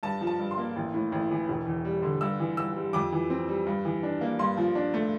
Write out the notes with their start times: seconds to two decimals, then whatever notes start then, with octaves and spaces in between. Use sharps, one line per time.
0.03 G2 A5
0.21 F3
0.27 A5
0.39 G2
0.51 C6
0.58 A#3
0.76 A1
0.94 A2
1.12 A1
1.31 E3
1.49 E1
1.67 E2
1.85 G3
2.02 D3
2.21 G2 E6
2.40 E3
2.57 G2 E6
2.76 G3
2.93 F2 D6
3.12 E3
3.30 C4
3.48 G3
3.66 G2
3.85 E3
4.03 D4
4.21 A#3
4.39 G2 C6
4.57 F3
4.75 D4
4.94 A3